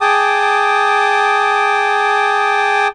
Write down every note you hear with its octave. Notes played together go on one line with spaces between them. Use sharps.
G#4 G5 A5 D6 D#6